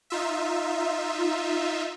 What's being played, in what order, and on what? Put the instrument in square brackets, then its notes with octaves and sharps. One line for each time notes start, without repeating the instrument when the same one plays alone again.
[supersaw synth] D#4 F4 E5